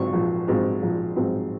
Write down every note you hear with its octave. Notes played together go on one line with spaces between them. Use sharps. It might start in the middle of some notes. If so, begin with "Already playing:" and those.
Already playing: G#2 F#3 C4 F4 C#6
A#1
G#2 F#3 C4 F4
A#1
G#2 F#3 C4 F4